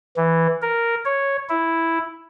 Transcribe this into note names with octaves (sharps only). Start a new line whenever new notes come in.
E3
A#4
C#5
E4